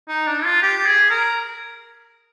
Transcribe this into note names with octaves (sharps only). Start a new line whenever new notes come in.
D#4
D4
F4
G4
G#4
A#4